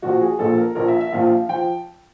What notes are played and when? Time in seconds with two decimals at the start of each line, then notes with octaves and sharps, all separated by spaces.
0.02 A#1 A#2 F3 F#4
0.21 G#4
0.39 A#1 A#2 F3 A4
0.58 A#4
0.75 A#1 A#2 F3 A#4
0.88 E5
1.01 E5
1.12 A#1 A#2 F3 F5
1.49 F3 G5